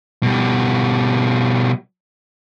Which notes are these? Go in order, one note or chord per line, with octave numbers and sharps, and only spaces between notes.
B2 G3